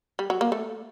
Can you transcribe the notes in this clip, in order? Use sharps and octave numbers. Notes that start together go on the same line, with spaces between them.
G3
F#3
A#3
A3